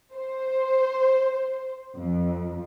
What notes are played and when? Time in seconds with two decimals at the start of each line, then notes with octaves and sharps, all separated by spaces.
0.15 C5
1.97 F2